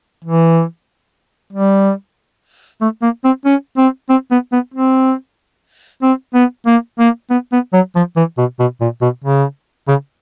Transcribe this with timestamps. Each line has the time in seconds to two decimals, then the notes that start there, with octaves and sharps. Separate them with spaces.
0.24 E3
1.53 G3
2.81 A3
3.02 A#3
3.24 C4
3.45 C#4
3.78 C4
4.10 C4
4.31 B3
4.52 B3
4.74 C4
6.03 C4
6.34 B3
6.66 A#3
6.99 A#3
7.30 B3
7.52 B3
7.73 F#3
7.96 F3
8.17 E3
8.38 B2
8.60 B2
8.81 A#2
9.02 B2
9.24 C#3
9.88 C#3